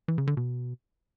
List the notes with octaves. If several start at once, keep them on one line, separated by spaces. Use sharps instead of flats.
E3
C#3
D3
B2